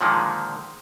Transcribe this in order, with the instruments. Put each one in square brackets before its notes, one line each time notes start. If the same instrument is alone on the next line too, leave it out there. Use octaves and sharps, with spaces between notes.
[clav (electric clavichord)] A#2 D3 D#3 F3 G#3 A#3